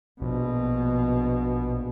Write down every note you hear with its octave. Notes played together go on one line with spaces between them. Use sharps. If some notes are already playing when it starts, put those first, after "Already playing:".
A#1 B2